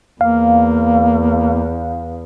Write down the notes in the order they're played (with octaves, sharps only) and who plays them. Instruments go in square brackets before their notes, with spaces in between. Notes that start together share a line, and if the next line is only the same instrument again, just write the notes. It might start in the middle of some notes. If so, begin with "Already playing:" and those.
[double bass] E2 [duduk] A#3 [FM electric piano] F5